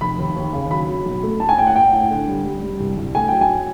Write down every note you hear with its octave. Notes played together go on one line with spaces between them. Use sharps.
F1 B5
D#2
D#2
C#3
F#3 B5
F#3
B1
A3
A2 A5
G#5
A2 G5
F#5
A2 G5
A2
D3
G3
G3
G3
C2
C2
A3 G#5
F#3 G5
G#5